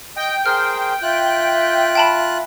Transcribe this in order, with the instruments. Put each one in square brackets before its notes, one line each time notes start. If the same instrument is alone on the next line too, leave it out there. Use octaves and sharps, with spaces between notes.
[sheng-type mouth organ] D#5 [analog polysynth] G5
[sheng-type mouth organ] G#4 A#4 C5 [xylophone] F6
[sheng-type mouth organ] F4 F#6 [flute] E5
[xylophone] G5 A5 B5